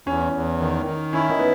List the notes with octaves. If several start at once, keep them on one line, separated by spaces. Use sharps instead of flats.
E2 C#4
E2
D#3
D#3
C#4 E4
D#4
B3